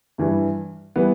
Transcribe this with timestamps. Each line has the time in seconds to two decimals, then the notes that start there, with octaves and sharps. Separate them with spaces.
0.18 G2 E3 G3
0.96 E3 G3 B3